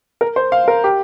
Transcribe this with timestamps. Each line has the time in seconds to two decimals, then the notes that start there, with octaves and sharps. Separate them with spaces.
0.21 A#4
0.36 C5
0.52 F5
0.68 A#4
0.84 G4